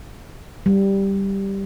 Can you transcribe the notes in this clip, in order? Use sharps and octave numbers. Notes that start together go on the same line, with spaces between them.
G3